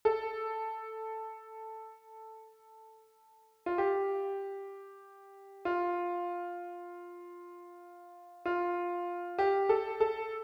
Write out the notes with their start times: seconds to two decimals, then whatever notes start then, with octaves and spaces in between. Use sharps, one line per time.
0.05 A4
3.66 F4
3.78 G4
5.65 F4
8.46 F4
9.39 G4
9.69 A4
10.00 A4